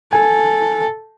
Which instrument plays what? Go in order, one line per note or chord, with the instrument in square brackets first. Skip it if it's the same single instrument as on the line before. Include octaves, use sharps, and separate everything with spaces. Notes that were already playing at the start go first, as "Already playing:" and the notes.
[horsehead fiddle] A4 [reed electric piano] G#5